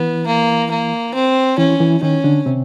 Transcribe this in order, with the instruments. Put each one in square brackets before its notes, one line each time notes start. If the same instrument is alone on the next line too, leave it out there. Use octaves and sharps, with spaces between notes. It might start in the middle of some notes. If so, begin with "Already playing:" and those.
Already playing: [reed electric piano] E3 E4 [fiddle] B3
[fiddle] A#3
A#3
C4
[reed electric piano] E3 E4 [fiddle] C#4
[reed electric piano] E3 E4
[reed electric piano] D#3 D#4 [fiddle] C#4
[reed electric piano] D3 D4
C3 C4